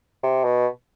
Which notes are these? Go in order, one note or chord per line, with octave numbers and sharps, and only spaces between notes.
C3
B2